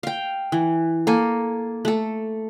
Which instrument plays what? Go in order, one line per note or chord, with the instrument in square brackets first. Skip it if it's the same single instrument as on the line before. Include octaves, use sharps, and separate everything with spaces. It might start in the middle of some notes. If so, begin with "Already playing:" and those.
[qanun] F5 G5
E3
A#3 A4 G#5
A3 A4